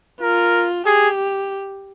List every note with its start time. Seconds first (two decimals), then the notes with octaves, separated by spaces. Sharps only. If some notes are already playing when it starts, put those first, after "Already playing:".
0.21 F4 A#4
0.86 G4 G#4